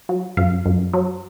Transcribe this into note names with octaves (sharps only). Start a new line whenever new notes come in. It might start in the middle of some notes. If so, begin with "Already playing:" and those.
F#3
F#2 F5
F#2
F#3